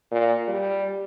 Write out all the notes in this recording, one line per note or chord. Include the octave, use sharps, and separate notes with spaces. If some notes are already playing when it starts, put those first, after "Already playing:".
A#2
G3